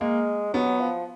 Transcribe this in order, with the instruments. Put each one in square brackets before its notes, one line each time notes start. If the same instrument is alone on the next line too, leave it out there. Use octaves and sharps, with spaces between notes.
[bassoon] G#3 [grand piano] A#3
[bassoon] F#3 [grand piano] B3
[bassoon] F3